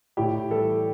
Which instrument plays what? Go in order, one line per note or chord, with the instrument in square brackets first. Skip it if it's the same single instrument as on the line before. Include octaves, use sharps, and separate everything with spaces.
[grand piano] A2 G4
E3 G3 A4